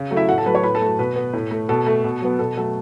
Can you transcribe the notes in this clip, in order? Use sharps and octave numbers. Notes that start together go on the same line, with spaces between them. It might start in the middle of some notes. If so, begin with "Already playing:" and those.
Already playing: C#3
F#3 A3
E4 E5
A2 F#4 F#5
A4 A5
F#3 A3 B4 B5
C#5 C#6
A2 B4 B5
A4 A5
F#3 A3
B2 B4
B3
A2
A3
B2 A4
A3
B2
F#3 B3
B2 A4
F#3 A3 A4